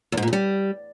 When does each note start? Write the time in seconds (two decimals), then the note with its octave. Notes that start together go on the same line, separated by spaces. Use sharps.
0.12 E2
0.17 G#2
0.22 A#2
0.28 G2
0.33 G3